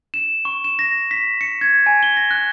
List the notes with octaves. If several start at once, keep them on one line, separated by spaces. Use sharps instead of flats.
E7
C#6
E7
A#6
B6
C#7
G#6
G#5
G7
A#6
F#6